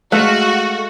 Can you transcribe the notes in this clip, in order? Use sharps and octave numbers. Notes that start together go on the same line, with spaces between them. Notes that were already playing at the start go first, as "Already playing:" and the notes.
G#3 A3 F#4 F5 F#6